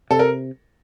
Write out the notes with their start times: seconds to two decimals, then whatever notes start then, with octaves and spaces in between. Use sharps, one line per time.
0.11 C3 A4
0.19 A#4